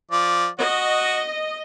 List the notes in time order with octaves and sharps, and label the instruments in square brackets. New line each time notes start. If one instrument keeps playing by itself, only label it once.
[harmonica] F3 D5
[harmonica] F#4 [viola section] D#5